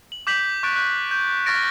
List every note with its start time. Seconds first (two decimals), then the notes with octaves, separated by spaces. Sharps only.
0.12 F#7
0.27 D6 G6 B6 F#7
0.63 C#6 F#6 A6 D7
0.76 F#6 G6
1.11 G6
1.46 C#6 F6 A6 A#6 D7